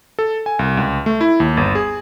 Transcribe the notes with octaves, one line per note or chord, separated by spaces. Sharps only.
A4
G#5
C2
C#2
A3
E4
D#2
G1
G#4